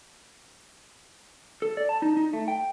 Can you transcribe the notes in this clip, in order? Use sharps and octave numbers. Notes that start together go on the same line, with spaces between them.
A4
D5
A5
D#4
D#4
A3
G5